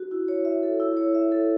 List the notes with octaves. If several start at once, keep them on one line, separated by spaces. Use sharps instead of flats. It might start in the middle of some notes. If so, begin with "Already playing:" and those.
Already playing: F#4
E4
C#5
E5
A4
E4
C#5
E5
A4